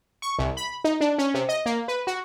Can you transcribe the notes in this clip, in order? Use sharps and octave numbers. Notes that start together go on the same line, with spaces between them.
C#6
C2
B5
D#4
D4
C#4
C3
D#5
A#3
B4
F#4